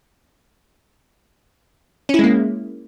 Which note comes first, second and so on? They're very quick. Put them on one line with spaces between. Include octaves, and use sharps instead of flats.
C#4 E4 G#3 A#3